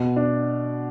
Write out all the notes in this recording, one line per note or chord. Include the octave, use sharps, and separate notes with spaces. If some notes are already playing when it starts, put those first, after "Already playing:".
Already playing: B2
D4